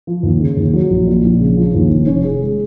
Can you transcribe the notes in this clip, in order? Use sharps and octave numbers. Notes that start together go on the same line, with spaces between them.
F3
D#2
C#3
D#2
F#3
A#1
A#2
A#1
C#3
F3
D#2
F1
C#4
G#4
G#3